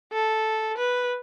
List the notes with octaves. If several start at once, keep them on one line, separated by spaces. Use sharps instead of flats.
A4
B4